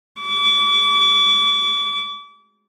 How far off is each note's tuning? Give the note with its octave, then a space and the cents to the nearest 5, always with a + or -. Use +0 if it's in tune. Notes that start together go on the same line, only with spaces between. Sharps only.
D6 -35